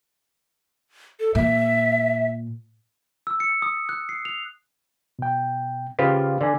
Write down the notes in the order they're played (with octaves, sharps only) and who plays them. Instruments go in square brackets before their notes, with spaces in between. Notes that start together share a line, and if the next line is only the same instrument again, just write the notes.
[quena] A4
[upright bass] A#2 [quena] E5
[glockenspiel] E6
C#7
D#6
F#6
C7
F7
[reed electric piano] B2 G5
[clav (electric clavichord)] C#3 F4 G4 [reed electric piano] B4 C5 F5
[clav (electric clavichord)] D3 [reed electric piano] D5 G#5